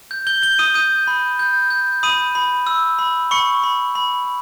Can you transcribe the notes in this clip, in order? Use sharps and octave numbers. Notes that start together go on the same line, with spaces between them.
G6
G6 G7
G6 G7
D#6 D#7
D#6 G6 D#7
B5
G6
G6
B5 D#6 D#7
B5
E6
B5
B5 C#6 C#7
B5
B5